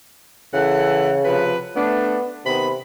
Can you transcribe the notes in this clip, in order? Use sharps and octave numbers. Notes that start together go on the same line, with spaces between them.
C#3 E3 A4 F#5
C3 F3 B4
A3 B3 D4
C3 D#3 B3 B5